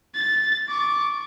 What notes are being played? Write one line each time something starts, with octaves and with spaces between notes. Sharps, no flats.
A6
C#6 D6